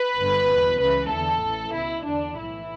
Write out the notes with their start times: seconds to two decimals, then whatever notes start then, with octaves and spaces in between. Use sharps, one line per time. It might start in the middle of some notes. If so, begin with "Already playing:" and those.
Already playing: B4
0.17 G1 G2 D3
0.49 E2 B2
0.80 C#2 C#3 E3 B4
1.11 E2 D3 A4
1.43 A1 A2 E3
1.74 C#2 B2 E4
2.05 E2 D3 D4
2.37 B1 A2 E3 E4